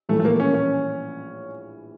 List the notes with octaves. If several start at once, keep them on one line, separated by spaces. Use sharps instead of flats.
A#1 A2 E3 G3 A3
A3
A#3
C#4
C#4